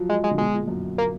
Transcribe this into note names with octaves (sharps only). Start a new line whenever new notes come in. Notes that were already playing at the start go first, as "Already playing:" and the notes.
Already playing: F3 F#3
G#3
G#3
D3
B2 G#3
A#2
F#2
A#3